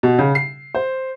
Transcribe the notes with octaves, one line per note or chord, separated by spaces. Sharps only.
B2
C#3
C7
C5